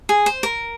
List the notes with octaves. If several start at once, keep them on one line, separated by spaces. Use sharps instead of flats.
G#4
C5
A#4